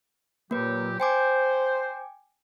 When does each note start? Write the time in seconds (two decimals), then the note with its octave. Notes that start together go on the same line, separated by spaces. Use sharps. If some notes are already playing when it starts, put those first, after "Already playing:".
0.51 A#2 F#3 A#3 G4 B4
1.00 C5 G5 G#5 D6